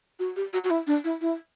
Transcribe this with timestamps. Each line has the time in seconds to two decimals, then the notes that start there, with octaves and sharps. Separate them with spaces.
0.19 F#4
0.36 G4
0.53 F#4
0.64 F#4
0.70 E4
0.87 D4
1.04 E4
1.21 E4